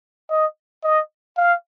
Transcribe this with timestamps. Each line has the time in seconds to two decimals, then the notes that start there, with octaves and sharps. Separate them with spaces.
0.30 D#5
0.83 D#5
1.37 F5